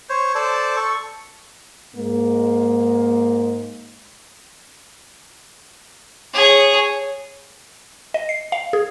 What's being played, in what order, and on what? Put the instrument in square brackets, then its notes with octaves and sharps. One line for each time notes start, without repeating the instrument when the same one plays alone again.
[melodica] C5 C#5
A4 C5 D5 A5
A4 C#6
[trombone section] G#2 G#3 A#3
[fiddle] G#4 C#5
[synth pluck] D#5
C7
F5
G#4